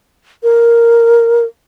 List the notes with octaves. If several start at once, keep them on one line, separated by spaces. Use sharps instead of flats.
A#4